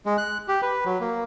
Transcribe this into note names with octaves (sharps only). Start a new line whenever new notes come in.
G#3
F#6
G4
B4
F#3
A#3